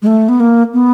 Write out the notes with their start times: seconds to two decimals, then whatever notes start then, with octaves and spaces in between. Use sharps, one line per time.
0.02 G#3
0.06 A3
0.29 B3
0.40 A#3
0.73 B3